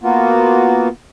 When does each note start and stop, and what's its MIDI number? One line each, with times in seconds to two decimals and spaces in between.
0.03 0.88 58
0.03 0.88 59
0.03 0.88 65
0.03 0.88 66